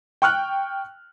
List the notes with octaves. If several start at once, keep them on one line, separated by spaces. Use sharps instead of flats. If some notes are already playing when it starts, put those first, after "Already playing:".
G5 C#6 F6 F#6